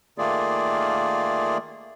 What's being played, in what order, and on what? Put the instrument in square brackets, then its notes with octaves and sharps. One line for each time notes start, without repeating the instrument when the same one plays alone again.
[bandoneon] D#3 A3 A#3 F4 G#4 D5